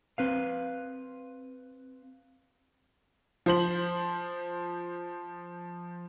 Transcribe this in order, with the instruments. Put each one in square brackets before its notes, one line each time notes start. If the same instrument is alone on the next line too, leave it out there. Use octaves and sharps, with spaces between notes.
[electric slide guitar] C4 B4 F5
[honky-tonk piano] F3 C5 F#7